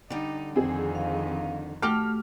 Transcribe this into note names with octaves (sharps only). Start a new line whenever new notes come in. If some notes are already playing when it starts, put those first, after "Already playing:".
D3 G3 D#4
F2 D#3 C4 G#4
F5
A3 F#4 G4 A4 F6